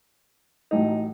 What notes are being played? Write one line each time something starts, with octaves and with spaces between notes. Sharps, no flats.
A1 A2 F#3 D#4